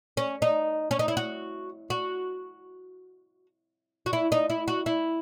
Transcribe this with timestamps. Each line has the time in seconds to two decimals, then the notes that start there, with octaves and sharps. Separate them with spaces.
0.17 C#4
0.42 D#4
0.91 C#4
0.99 D#4
1.08 E4
1.17 F#4
1.90 F#4
4.06 F#4
4.13 E4
4.32 D#4
4.50 E4
4.68 F#4
4.86 E4